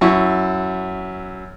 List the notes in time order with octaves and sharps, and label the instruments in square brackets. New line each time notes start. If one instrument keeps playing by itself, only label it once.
[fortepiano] F#2 E4 C#6